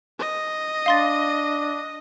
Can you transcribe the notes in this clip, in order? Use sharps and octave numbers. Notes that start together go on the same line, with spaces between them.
D#5
D4 F5 C6 A6